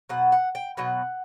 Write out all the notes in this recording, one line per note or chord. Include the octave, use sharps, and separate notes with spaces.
B2 F#3 F#5
F#5
G5
B2 F#3 F#5